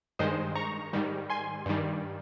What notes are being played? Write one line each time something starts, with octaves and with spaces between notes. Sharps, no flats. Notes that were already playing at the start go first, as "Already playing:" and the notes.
G2 D#3 G#3 C5 D#5
A#5 C#6
G#2 D#3 G3
G#5 C6
G2 D#3 G3